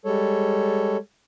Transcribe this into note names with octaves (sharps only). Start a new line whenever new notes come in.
G3 G#3 A4 C#5